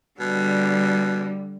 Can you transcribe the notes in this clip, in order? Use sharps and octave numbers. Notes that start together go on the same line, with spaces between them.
B2 D3 G3